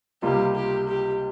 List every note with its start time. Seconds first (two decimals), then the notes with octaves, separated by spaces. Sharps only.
0.22 C#2 C3 G3 A#3 F4 G4
0.55 G4
0.88 G4